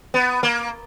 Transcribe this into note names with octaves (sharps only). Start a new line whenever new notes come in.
B3
A#3